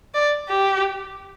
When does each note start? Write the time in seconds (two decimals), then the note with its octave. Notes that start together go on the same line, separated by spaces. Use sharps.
0.14 D5
0.49 G4